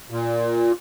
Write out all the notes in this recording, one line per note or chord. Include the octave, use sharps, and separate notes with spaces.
A#2